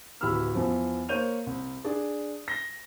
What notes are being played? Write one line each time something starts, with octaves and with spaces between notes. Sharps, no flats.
D1 E3 G4 B5 E6 F6
E2 F3
A#3 C5 C#5 G6 D#7 F7
C2
D4 G#4 D5
A#6 G7